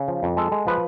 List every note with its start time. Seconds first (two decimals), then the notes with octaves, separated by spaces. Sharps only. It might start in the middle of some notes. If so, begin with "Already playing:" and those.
Already playing: C#3
0.08 F3
0.23 F2
0.37 G#3 A4
0.52 G#3
0.67 F3 B4